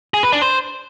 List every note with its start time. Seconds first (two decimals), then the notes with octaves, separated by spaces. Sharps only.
0.14 G#4
0.23 B4
0.32 D4
0.42 C5